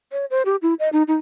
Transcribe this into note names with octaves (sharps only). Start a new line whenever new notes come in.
C#5
C5
G4
E4
D#5
D#4
D#4